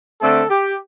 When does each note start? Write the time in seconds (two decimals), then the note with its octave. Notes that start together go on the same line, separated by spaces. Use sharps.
0.21 D3 A3 C4 A4
0.50 G4